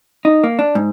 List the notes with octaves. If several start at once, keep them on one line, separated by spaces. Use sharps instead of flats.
D#4
A#3
D4
G#2